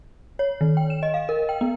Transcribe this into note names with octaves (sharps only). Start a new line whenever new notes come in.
C#5
D#3
G5
E7
D#5
F5
A#4
G5
B3